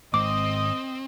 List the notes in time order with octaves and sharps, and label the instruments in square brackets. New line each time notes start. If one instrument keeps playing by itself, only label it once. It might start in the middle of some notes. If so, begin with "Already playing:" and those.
[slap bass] G#2 D#3 G#3 [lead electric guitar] C4 [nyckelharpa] D#5 D#6 [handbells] D6